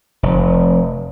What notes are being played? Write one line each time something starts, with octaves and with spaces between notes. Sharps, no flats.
F1